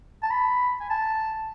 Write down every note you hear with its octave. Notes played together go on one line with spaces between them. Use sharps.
A5
B5
G#5
A5